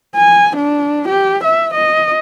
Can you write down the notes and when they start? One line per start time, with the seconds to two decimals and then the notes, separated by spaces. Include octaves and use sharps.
0.16 G#5
0.57 D4
1.09 G4
1.44 E5
1.74 D#5